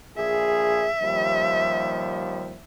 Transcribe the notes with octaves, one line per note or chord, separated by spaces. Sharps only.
A#1 G#4 E5
D#2 F3 G3